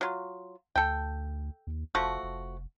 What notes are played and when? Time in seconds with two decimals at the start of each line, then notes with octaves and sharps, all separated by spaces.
0.01 F#3 F4
0.76 D2 A4 G5
1.67 D#2
1.95 F1 F3 A3 F#4
2.23 F1